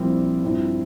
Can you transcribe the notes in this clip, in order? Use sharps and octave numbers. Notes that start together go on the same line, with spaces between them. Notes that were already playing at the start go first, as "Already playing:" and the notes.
Already playing: A#1 A#2 G3 C4 E4
G2 F3 C4 E4